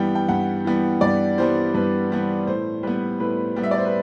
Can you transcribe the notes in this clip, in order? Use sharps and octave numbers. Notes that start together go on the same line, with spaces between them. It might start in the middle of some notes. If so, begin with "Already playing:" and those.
Already playing: G2 E3 G3 B3 G5
G5
G2 F#5
E3 G3 B3
G2 D5
E3 G3 B3 C5
G2 B4
E3 G3 B3
A2 C5
G3 B3 B4
A2 B4
G3 B3
E5
D5
C5
B4